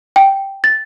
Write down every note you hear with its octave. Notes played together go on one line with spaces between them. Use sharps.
G5
A6